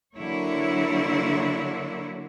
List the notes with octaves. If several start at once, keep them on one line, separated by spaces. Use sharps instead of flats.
D3 F#3 A#3 E4 C#5